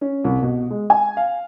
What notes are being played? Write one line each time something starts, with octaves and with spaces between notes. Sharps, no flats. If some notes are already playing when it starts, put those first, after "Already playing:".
C#4
C2
B2
G#3
G#5
F5